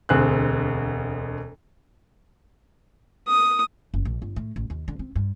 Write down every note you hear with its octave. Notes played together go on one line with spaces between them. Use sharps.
E1 D2 C4 G#4 F#6
D#6
F#1
A#1
G1
A2
A1
D#2
D3
C4
G2